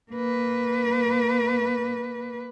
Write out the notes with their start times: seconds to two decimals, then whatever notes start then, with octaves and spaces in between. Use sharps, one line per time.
0.12 A#3 B4